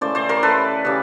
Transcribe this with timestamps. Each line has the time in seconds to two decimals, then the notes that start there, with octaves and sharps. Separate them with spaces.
0.01 C#3 E3 A3 C5 D5
0.15 C5 D5
0.29 A#4 C5
0.43 A4 B4
0.85 C#3 E3 G3